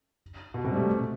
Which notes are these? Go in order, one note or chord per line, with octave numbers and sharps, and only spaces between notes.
B2
C3
G3
A3